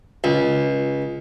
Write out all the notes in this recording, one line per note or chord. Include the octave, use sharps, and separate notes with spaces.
C#2